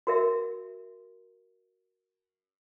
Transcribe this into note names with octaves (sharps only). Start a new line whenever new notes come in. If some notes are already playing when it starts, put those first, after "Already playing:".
F#4 A#4 E5